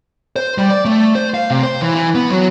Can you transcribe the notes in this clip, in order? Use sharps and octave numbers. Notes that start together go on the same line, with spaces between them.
C5
G3
D5
A3
C5
F5
C3
C5
E3
E3
B3
F#3